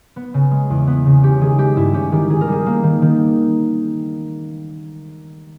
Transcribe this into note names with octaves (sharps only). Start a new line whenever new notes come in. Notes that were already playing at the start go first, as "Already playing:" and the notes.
B3
C#3
G#3
E2
B3
C#3
C#4 G4
D#3 G#4
G#3 G4
G2 E4
C#4 G4
D#3 G4
D#3 G#4
A#4
G3 G#4
A#3
D#3
D#3